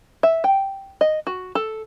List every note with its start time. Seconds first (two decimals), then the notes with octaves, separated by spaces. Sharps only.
0.23 E5
0.44 G5
1.01 D#5
1.27 F#4
1.55 A4